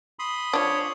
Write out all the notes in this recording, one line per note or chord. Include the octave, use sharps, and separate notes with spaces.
B5 C6 D#6
F3 D4 C#5